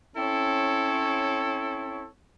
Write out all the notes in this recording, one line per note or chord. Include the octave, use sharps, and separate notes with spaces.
C4 C#4 E4 A4 C#5